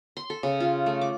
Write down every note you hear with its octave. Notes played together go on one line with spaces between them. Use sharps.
C6
A4
C#3
F4
A3
D6